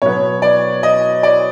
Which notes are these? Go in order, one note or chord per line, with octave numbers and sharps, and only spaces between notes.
B2 F#3 B3 C#5
D5
D#5
D5